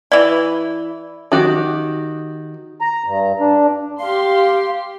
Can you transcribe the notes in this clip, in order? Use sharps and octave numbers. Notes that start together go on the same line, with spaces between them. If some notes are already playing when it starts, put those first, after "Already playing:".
E3 D5 B5
D#3 F#4 G4
A#5
G2
D4
G4 F5 C6